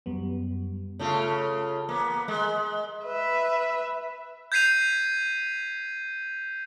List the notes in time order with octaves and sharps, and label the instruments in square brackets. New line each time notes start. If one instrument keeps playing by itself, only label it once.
[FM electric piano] F#2 G3 B3
[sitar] C#3 A3 F4
A#3 B3
G#3
[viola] B4 E5
[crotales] G6 G#6 B6 C7 D#7 F7